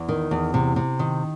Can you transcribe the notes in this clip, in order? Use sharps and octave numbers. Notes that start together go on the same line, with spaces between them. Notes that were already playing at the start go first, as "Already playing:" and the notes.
Already playing: E2
D#3
E2
C3
C3
D#3